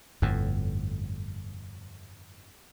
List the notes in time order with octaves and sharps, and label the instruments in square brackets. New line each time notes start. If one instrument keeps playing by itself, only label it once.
[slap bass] G1 F2 A2